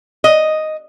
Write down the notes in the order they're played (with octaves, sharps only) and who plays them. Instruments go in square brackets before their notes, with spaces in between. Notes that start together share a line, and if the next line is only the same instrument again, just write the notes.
[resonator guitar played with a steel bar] D#5